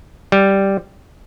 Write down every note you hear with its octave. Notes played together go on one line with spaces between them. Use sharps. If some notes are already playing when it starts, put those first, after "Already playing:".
G3